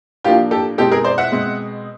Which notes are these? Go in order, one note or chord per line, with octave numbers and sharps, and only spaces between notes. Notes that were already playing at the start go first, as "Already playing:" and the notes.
A2 F3 A#3 D4 F4 G4
G4 A4
B2 G#3 C4 G4 A4
G#4 A#4
C5 D5
E5 F#5
B2 G#3 C4